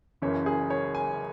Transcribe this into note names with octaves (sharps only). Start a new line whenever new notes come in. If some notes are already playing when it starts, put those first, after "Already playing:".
F#1 F#2 C#3 E3 C#5
G#4
C#5
G#5